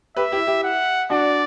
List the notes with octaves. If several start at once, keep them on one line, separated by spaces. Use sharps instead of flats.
G4 B4 E5
E4 G4
E4 G4
F#5
D4 F#4 D5